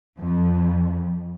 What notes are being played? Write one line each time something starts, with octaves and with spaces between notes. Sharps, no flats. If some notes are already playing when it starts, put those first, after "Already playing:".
F2